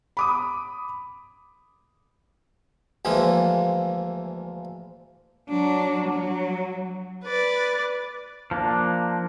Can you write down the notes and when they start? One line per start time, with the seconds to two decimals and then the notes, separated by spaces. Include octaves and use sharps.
0.17 B5 D6 D#6
3.05 D2 E3 F3 G#3 A#3
5.49 F#3 D4
6.08 F#3
7.24 B4 D5
8.51 F3 A#3 D4